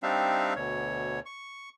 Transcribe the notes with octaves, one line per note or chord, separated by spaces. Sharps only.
G3 C4 D4 D#4 E5 F5
D2 B2 C#5
C#6